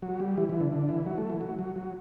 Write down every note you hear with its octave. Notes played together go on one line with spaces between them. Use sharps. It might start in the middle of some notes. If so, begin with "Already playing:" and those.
F#3
G3
E3
E3
D3
D3
E3
F#3
A3
E3
F#3
F#3
F#3